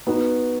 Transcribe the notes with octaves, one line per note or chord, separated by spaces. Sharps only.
B3 D#4 F#4 B4